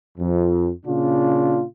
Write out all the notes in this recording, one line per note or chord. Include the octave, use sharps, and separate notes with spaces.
F2
A#2 C#3 D4 F4